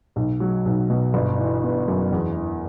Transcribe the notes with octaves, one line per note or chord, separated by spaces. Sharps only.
B1
F#3
B1
B2
G1
E3
B3
F#2
E2
E3